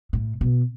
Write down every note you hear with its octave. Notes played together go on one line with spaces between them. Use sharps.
A2
B2